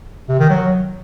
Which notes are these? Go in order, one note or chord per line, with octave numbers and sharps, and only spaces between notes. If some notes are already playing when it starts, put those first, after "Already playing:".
C3
D#3
F#3